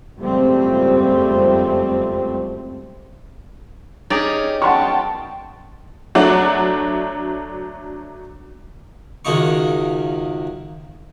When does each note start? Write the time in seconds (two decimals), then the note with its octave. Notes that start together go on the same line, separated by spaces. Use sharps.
0.17 F#1 F2 G#2 G3 A3 C4
4.10 C#4 D#4 G4 G#4 D5
4.62 F#2 B2 F#5 G5 A5 C6 C#6
6.15 F#3 A3 D4 F#4
9.25 C#2 F#2 D#3 A#3 D#4 C#6